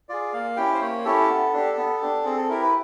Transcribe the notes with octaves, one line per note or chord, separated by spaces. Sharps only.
F4 G#4 D5
A#3 F5
C#4 E4 G4 G5
C5
A#3 C#5
C#4 E4 G4 A4
B3
D4 G4
B3
D4 G4
C4 G#4
A4
E4 G4 A#4
B4